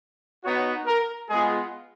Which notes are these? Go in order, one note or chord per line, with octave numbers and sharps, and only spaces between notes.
B3 D#4 F#4 C#5
A#4
G#3 B3 F4 G#4